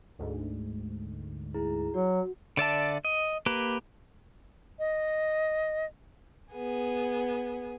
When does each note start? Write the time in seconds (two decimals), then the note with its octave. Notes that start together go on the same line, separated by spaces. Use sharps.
0.19 D2 G#2
1.54 E4 G#4 A#5
1.94 F#3 F#4
2.57 D3 D5 E5 A5
3.05 D#5
3.46 A#3 G4 B4
4.79 D#5
6.53 B3 G#4